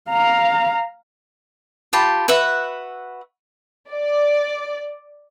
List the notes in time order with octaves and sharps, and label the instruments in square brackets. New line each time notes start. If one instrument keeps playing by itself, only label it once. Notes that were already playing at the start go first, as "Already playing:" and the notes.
[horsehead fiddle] F5 A#5
[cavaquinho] F4 G4 A5 B5
F#4 B4 E5 F#5
[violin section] D5